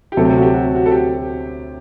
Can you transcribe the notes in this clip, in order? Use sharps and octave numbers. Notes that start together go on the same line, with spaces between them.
G4
D2 C3 F#3 A4
G4
A4
F#4
G4
F#4
F#4
A4
G4